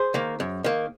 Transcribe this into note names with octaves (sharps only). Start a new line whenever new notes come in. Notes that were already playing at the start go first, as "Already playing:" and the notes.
Already playing: G#4 C5
D#3 A#3
F#2
D#3 A#3